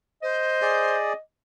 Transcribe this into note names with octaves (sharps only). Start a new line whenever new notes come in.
C5 D#5
G#4 D5